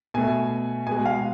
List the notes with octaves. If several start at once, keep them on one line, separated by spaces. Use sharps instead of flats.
B2 A3 G#5
B2 G#3 G#5
F5